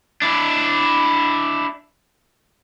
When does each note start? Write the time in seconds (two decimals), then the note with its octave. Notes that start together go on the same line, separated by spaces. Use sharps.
0.22 D4 E4